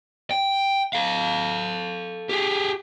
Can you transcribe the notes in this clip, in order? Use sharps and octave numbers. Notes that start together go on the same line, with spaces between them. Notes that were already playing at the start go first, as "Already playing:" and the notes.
G5
A4 F5
G4 G#4